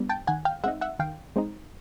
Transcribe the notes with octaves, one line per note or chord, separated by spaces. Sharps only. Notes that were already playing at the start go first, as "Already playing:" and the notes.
Already playing: G3 B3 D4
G5 A5
D#3 F#5 G#5
F5 G5
G#3 C4 D#4 E5 F#5
E5 F#5
D#3 F5 G5
G#3 C4 D#4